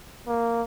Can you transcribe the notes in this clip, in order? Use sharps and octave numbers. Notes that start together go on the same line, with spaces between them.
A#3